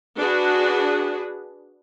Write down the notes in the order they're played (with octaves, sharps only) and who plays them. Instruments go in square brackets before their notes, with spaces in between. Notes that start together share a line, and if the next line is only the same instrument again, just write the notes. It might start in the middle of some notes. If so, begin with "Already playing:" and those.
[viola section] D4 F#4 G#4 B4